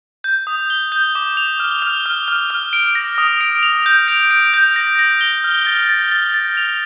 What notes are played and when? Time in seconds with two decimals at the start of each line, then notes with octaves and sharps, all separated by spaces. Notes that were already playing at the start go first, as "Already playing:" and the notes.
0.24 G6
0.47 D#6
0.70 G7
0.92 G6
1.15 D6
1.37 F7
1.60 F6
1.82 F6
2.06 F6
2.28 F6
2.50 F6
2.73 D7
2.95 A#6
3.18 D#6
3.41 D7
3.63 F7
3.86 G6
4.08 D7
4.31 D7
4.54 G6
4.76 A#6
4.99 A#6
5.21 G7
5.44 F6
5.66 A6
5.89 A6
6.12 A6
6.34 A6
6.57 F7